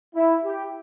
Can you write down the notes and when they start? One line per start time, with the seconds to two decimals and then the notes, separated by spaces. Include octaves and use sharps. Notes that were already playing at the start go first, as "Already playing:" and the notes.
0.16 E4
0.44 G4